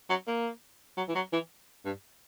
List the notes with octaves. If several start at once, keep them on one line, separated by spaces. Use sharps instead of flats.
F#3
A#3
F#3
E3
F#3
E3
G2